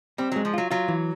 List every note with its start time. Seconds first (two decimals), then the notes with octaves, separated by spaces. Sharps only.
0.18 G3 C4
0.32 F#3
0.36 G#3
0.45 F3
0.54 F#3 F4
0.71 F#3 F4
0.88 E3